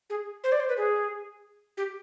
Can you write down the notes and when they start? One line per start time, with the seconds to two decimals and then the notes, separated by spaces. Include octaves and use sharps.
0.10 G#4
0.44 C5
0.52 D5
0.60 C5
0.69 B4
0.77 G#4
1.77 G4